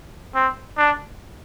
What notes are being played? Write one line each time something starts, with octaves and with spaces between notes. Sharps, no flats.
C4
D4